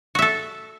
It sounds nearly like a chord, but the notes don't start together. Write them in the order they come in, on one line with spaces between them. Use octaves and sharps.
F#4 E5 A4